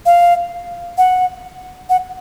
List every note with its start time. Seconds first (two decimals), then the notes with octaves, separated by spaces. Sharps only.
0.06 F5
0.98 F#5
1.90 F#5